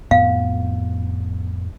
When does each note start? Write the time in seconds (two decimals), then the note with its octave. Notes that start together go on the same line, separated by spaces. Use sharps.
0.11 F2 A2 B3 F5